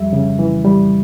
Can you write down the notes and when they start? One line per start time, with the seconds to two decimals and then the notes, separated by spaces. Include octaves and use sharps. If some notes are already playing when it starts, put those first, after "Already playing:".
Already playing: F2 G3 E5
0.13 C#3
0.39 E3
0.65 G3